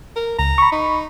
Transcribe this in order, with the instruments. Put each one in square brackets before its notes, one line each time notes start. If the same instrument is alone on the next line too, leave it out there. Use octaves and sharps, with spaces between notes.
[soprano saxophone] A#4
[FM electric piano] C#2 [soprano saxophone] A#5
[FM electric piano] B5 C#6
[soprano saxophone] D#4